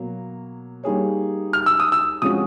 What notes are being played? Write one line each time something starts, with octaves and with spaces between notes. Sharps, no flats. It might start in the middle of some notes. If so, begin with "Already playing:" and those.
Already playing: B2 F#3 A#3
G3 A#3 D#4 G#4 C#5
F6
E6
D#6
E6
C3 F3 G#3 C#4 F#4 D#6